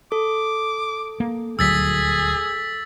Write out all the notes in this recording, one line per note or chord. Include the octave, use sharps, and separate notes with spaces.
A4 D6
A#3
D#1 D2 F#3 G#4 E6 A6 B6